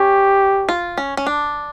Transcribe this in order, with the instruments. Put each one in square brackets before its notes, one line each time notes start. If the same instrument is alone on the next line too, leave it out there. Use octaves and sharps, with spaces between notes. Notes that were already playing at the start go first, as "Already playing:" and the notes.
Already playing: [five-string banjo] C#4 [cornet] G4
[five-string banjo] F4
C#4
C#4
D4